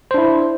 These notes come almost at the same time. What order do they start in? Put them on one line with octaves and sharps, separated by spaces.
C5 D4 E4